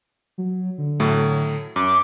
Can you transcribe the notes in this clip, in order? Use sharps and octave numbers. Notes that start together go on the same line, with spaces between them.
F#3
D3
A2 F#3 A3
F#2 D6